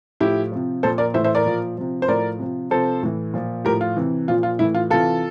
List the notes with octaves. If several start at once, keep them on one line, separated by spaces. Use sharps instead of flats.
A2 F3 E4 G4
C3 F3
A#2 F3 A4 C5
A#4 D5
A2 E3 C5 E5
C5 E5
A#4 D5
A#2 F3
C3 F3
C5
A2 F3 A#4 D5
C3 F3
C3 F3 A4 C5
A2 E3
A#2 F3
A2 F3 G4 A#4
F4
C3 E3
A#2 F3 F4
F4
A2 E3 E4
F4
C3 E3 F4 A4